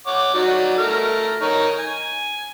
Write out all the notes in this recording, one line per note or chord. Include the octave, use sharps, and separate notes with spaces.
C#5 F#5 D6
F#3 D#4 D5
A3 A#5 F6
D#4 A#4 C#5
G#5